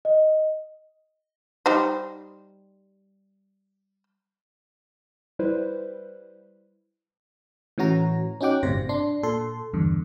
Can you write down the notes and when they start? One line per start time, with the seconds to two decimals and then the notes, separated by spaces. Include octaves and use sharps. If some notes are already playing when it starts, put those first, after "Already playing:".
0.05 D#5
1.66 G3 D#4 C5
5.39 G3 E4 B4 C5
7.78 A2 E3 C#4 F#4 A#5
8.41 C#4 D#4 F#4 G5 D6 F#6
8.63 G1 A2 C3 C5 A#6
8.89 D4 C6
9.23 A#2 A4 C6
9.73 E2 G2 D3